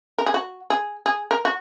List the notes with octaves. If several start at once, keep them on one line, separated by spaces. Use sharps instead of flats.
A#4
G#4
F#4
G#4
G#4
A#4
F#4